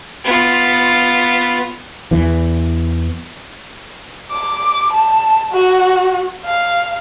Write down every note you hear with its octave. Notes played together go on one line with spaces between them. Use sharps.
B3 F4
E2 E3
D6
A5
F#4
F5